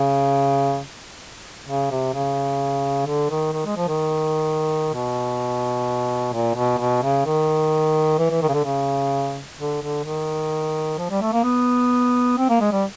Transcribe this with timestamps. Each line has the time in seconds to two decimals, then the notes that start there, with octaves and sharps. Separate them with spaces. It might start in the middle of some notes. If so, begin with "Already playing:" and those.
Already playing: C#3
1.67 C#3
1.91 C3
2.14 C#3
3.06 D3
3.30 D#3
3.53 D#3
3.65 G#3
3.77 F3
3.88 D#3
4.93 B2
6.33 A#2
6.55 B2
6.79 B2
7.02 C#3
7.26 D#3
8.18 E3
8.30 E3
8.42 D#3
8.49 C#3
8.54 D3
8.65 C#3
9.58 D3
9.81 D3
10.04 D#3
10.98 F3
11.10 G3
11.21 A3
11.33 A#3
11.44 B3
12.38 C4
12.49 A#3
12.61 G#3
12.72 G3